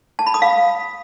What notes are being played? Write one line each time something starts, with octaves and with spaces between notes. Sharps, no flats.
A5
B5
D#6
F5